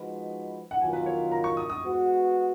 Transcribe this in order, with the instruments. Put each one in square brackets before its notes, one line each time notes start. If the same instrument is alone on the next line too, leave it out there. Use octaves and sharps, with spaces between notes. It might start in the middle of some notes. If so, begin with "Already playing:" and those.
Already playing: [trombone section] F3 G#3 D#4 F#4 B4
[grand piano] F#5
[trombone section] D#3 F#3 B3 F4 A#4 [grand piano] G#5
[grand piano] B4
C#5
A#5
C#6
D#6
D#6
[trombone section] G#3 B3 F#4 B4